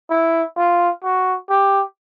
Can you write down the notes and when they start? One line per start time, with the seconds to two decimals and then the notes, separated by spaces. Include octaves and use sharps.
0.10 E4
0.57 F4
1.04 F#4
1.50 G4